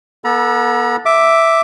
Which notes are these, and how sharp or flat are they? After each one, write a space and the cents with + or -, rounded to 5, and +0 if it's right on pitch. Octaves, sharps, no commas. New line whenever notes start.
B3 -35 A4 +0 A#5 +45
E5 +0 D6 +0